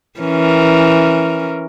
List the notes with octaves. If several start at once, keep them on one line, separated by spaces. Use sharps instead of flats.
E3 C#4 A#4